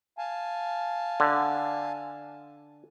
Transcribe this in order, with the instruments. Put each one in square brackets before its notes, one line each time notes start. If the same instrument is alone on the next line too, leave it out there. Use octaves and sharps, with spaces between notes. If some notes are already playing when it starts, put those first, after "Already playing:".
[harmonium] F5 G#5 A5
[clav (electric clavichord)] D3